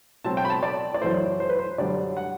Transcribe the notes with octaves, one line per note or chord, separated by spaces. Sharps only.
B2 F#3 C4 A5
G5
B5
A5
D5
D5
F#2 E3 A3 C5
C5
B4
C5
F#2 D3 G3 D4 D5
F#5